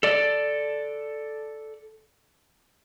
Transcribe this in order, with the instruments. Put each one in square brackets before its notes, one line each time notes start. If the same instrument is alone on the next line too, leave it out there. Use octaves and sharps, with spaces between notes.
[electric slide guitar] A4 D5